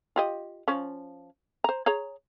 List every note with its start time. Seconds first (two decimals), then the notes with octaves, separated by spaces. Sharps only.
0.16 F4 G4 D#5
0.68 F3 C#4
1.64 C5 A#5
1.86 G#4 C#5 A#5